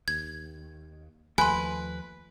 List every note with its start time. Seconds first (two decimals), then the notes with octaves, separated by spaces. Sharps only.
0.08 D#2 G#6
1.38 D#2 F3 A3 B4 G#5 C6